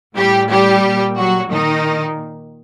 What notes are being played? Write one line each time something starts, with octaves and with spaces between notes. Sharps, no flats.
A2 G3 G4
G3 G4
A#2
F#3 F#4
A#2 D#3 D#4